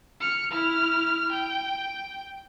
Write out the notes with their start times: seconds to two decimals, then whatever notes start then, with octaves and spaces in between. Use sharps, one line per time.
0.20 F6 C#7
0.51 E4 F6
1.32 G5